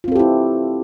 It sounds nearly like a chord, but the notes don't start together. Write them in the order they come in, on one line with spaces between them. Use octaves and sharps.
F4 C4 A4 G4 E4